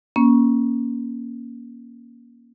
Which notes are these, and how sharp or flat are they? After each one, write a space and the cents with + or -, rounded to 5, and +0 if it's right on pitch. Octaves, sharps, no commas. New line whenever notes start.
A#3 +20 C#4 +0